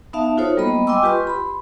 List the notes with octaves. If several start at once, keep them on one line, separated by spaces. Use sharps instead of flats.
B3 D#4 E5 F5 A5
D#4 F4 F#4 A4 C5 C#5
G3 A#3 B3 D#5 B5
D#5 G5 G#5 C6 D6 E6
F4 G4 B4 C6 C#6
B5 C6